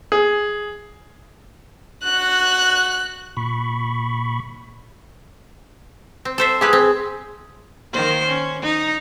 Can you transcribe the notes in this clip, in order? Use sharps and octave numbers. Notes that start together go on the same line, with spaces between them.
G#4
F#4 F#6
A#2 B5 C#6
C4
A4 C5 E5
E4 G4 G#4 B4
C4
D#3 A#3 C5
C#4
D#4